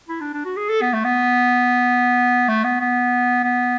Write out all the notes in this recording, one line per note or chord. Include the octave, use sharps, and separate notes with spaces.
E4
D4
D4
F#4
G#4
A4
B3
A3
B3
A3
B3
B3
B3